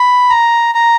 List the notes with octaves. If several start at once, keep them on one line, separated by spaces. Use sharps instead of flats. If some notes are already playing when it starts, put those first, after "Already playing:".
Already playing: B5
A#5
A#5